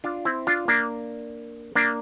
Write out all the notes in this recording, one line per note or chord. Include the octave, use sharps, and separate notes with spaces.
D4 F4
C4 E4
D4 F4
A#3 D4
A#3 D4